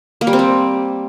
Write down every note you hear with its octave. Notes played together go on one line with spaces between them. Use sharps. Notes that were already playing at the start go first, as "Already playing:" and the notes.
A#3
G3
C4
G3